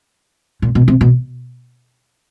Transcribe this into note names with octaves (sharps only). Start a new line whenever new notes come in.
A#2
B2
C3
B2